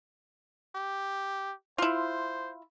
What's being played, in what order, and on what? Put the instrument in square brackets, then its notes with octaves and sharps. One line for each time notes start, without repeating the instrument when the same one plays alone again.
[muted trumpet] G4
[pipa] E4 F4 [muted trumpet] C5